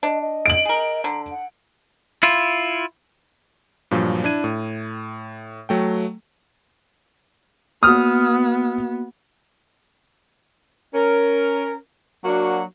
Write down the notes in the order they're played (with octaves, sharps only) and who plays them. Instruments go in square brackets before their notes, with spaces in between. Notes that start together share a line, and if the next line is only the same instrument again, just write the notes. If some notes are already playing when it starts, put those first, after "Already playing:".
[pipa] D4 [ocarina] D#5
[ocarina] D#5
[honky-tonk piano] D7 F#7
[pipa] G#4 A#4
[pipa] D3 [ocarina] A#5
[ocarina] F#5
[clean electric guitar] E4 F4
[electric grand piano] G2 A#2 F3 F#3
D4 E4 G#6 D#7
A2
F#3 A3 G5
[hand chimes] A#3 F#4 [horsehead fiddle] B3 [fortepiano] D#6 F6
[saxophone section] C#4 A#4
F#3 A#3 D4 F#4